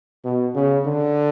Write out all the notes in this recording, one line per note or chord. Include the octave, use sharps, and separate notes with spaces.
B2
C#3
D3